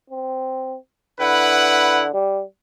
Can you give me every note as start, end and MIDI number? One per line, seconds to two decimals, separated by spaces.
0.10 0.77 60
1.20 2.09 50
1.20 2.06 64
1.20 2.06 71
1.20 2.06 78
2.14 2.42 55